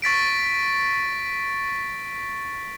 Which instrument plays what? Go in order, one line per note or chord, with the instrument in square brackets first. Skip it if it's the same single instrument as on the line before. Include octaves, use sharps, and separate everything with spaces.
[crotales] C#6 A6 B6 D7